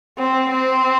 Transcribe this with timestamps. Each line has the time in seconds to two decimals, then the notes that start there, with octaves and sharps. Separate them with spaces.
0.18 C4
0.50 C4